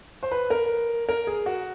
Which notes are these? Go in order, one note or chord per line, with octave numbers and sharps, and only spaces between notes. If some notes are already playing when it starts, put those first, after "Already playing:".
C5
B4
A#4
A#4
G#4
F#4